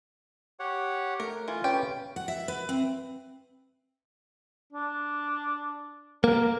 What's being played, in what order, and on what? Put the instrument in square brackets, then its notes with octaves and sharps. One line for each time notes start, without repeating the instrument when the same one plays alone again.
[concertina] G4 C#5 F#5
[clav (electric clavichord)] A3 [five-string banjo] A#4
[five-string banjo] E3 [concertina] F4
[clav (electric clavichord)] C#4 B4 [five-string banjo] G4
[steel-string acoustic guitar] F#5
E5
B4
C4
[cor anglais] D4
[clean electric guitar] A#3 [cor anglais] A#4